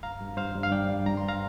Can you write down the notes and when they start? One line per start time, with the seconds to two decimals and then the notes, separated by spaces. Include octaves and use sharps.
0.03 G2 F5 A#5
0.21 G2
0.37 G2 C5 F5
0.55 G2
0.63 F5
0.71 G2 D5 G5
0.88 G2
1.06 G2 A#5
1.17 C6
1.23 G3
1.28 F5 A#5